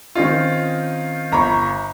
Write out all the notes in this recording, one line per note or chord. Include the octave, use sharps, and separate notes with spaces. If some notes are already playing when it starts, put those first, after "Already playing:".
D#3 C4 C#4 D#4 F4
G1 A#5 B5 C#6